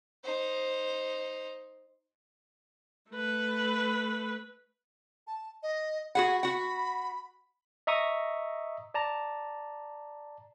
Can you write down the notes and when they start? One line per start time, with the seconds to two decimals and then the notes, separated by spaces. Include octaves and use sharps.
0.24 D#4 C5
3.11 A3 B4
5.27 A5
5.63 D#5
6.15 F#4 G#4 F#5 B5
6.43 F#4 F#5
7.87 D#5 E5 A#5 C#6 D#6
8.94 D5 A5 A#5